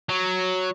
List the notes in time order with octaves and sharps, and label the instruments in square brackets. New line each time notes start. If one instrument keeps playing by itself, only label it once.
[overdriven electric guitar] F#3